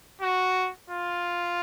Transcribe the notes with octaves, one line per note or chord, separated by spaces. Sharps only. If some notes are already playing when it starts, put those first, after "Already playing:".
F#4
F4